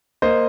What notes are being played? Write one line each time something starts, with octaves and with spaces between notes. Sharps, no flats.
A#3 C5 D#5